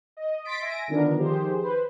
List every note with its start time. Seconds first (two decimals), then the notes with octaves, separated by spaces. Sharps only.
0.17 D#5
0.45 C6 A6 B6 D7
0.62 E5 G#5 A#6 D7
0.88 D3 D#3 F3 B3 D4 A#4
1.18 D#3 F3 G4 G#4 C5
1.58 B4 C5